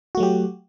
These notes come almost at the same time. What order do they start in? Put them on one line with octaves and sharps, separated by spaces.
F#4 A3 F#3 G4